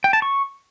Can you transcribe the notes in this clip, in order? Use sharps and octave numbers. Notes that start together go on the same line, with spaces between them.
G5
A5
C#6